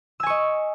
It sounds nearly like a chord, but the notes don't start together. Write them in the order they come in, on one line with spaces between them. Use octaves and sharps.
E6 G#5 C#6 D#5